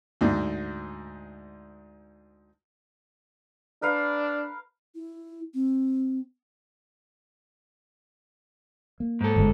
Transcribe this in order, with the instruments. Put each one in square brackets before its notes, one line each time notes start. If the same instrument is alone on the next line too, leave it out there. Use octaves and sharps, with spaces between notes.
[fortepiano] D2 G#2
[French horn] D4 [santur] A#4 B4 F5
[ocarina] E4
C4
[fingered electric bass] A#3
[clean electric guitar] G#2 A4
[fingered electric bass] G1 G#3